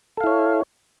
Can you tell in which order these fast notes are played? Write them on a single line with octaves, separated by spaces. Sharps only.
A4 F5 E4 C#5